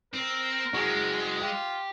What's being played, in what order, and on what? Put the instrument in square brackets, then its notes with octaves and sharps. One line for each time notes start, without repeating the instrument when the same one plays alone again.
[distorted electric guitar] C4 [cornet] A#4
[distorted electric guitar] G#3 [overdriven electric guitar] F#4 G#4
[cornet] F4 [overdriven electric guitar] G4